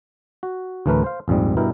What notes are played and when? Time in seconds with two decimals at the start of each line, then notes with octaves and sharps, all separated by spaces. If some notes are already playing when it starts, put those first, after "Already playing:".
0.43 F#4
0.86 D2 A2 E3 A3 A#4 B4
1.04 C5 F5
1.28 A#1 F2 G#2 G3
1.57 G2 B2 E4 A#4 G5